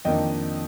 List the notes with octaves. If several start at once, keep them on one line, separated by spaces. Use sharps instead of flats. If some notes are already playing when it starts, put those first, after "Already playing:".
F2 D#3 A#3 D4 D#5 G5